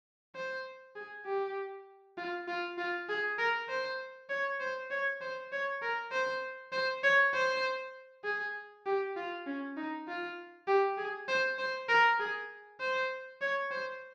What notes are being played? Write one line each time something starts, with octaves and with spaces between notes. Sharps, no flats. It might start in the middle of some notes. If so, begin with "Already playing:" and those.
C5
G#4
G4
F4
F4
F4
G#4
A#4
C5
C#5
C5
C#5
C5
C#5
A#4
C5
C5
C#5
C5
G#4
G4
F4
C#4
D#4
F4
G4
G#4
C5
C5
A#4
G#4
C5
C#5
C5